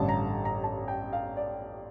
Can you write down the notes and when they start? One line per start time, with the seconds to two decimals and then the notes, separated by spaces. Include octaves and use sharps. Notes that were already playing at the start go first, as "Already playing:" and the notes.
Already playing: A1 G2 D3 G3 A5
0.09 A#5
0.45 A#5
0.64 A5
0.88 G5
1.13 F5
1.37 D5